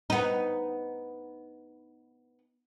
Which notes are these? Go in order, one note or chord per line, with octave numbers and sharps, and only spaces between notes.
B3 D#4